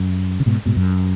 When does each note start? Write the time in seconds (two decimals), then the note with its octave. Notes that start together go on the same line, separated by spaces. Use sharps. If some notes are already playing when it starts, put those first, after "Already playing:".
Already playing: F#2
0.40 C#3
0.46 G#2 B2
0.66 G#2 B2
0.76 F#2